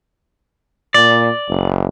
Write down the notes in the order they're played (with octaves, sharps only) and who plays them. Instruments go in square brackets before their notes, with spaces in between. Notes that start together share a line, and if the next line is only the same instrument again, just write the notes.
[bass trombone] A#2 [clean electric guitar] D5
[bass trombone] F#1